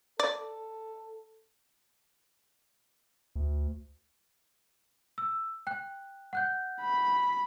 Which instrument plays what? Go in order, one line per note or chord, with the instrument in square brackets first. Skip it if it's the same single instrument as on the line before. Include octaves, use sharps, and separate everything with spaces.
[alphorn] A4 [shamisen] D5
[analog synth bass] D2
[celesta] E6
G5 F#6
F#5 F#6 G6
[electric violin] B5